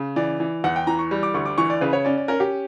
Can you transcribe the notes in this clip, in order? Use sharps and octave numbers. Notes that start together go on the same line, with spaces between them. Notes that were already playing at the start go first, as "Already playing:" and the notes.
Already playing: C#3
E3 D5
E3
E2 F#5
G5
E3 A#5
C#6
G3
D6
D2 C#6
D6
E3 C#6
D5
C#3 B4
C#5
C#4 D5
D5
C#4 A#4
G4